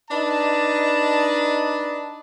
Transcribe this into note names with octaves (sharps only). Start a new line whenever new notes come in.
D4 D#4 B4 D5 D#5 A5